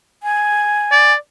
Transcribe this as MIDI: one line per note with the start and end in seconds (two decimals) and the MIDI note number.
0.23 1.13 80
0.92 1.14 74